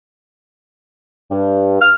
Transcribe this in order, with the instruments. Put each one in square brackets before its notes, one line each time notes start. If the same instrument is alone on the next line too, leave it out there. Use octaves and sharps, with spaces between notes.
[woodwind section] G2
F6